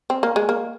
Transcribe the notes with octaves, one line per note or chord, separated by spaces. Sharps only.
C4
A#3
G#3
A#3